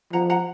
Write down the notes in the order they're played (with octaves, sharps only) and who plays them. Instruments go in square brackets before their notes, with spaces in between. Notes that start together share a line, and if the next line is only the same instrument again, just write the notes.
[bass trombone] F3 [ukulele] F#5 A#5
[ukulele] F#5 A#5